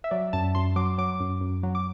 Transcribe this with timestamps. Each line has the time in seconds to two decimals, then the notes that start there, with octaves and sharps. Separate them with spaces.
0.04 E5
0.11 F#3 D5
0.33 F#2 A5
0.55 F#2 C6
0.76 F#3 D6
0.98 F#3 D6
1.20 F#2
1.41 F#2
1.63 F#3
1.75 D6